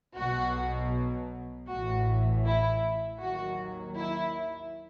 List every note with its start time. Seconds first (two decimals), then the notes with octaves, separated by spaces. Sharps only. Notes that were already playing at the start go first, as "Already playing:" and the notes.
0.15 B1 B2 F#3 F#4
1.68 A1 A2 E3 F#4
2.45 E4
3.21 D#2 D#3 F#3 F#4
3.97 E4